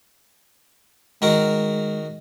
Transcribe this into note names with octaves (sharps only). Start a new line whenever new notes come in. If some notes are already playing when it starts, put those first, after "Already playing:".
D#3 G#3 F#4 A#4